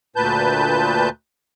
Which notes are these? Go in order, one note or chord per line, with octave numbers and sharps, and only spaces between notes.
D2 A#2 B4 A5 G6